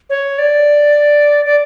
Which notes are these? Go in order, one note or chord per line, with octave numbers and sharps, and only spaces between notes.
C#5
D5
D5